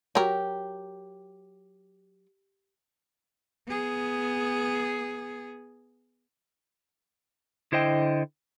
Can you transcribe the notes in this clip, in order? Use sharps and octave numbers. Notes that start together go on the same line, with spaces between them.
F#3 G4 A#4
B3 G#4
D3 E4 C5 D#5 G5